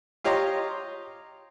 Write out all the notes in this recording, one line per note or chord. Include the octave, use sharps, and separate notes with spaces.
F4 G4 C#5 D#5 A#5 C6